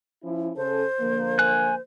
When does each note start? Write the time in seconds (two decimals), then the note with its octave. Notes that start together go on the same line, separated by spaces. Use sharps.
0.24 F3 C#4 E4
0.56 C#3 C#4 A4 C5
1.00 D3 F3 A#3
1.39 G#5 F#6